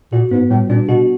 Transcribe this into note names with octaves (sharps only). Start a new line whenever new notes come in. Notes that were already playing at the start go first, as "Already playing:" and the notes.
A#2 F#4
G#2 B3
A2 G3
A#2 D4
B2 F#4